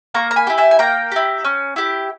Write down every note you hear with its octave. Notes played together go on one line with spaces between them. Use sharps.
A#3 A#5 C#6
A#5
G#5 B5
E4 G4
E5 G#5
G#5
A#3 G5 A#5
E4 G4
C#4
E4 G4